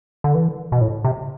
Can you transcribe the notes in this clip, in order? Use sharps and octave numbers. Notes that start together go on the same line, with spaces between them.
D3
E3
B2
A2
C3